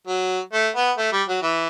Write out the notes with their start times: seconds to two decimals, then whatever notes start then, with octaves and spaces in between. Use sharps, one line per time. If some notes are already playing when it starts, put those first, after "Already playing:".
0.07 F#3
0.53 A3
0.75 B3
0.98 A3
1.12 G3
1.28 F#3
1.42 E3